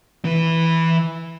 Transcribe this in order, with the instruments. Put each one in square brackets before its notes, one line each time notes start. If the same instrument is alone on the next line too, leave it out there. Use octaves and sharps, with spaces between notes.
[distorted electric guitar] E3 B4